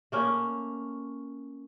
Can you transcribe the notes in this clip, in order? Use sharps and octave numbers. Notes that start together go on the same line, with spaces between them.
A3 A#3 C#4